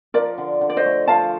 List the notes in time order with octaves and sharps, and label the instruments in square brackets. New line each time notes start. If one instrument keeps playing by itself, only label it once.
[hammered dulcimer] F3 [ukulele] A#4 D5
[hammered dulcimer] D3
D3
[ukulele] D5
C5 D#5
[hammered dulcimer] A3
[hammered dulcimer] F3 [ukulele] F5 A5